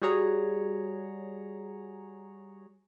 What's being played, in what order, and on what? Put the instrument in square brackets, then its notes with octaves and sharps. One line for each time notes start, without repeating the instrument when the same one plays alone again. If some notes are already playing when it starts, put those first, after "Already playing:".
[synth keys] G3 F#4 G#4 C#5 A#5